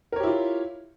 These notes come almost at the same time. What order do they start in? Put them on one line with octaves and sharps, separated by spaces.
A#4 C#5 G4 E4 F4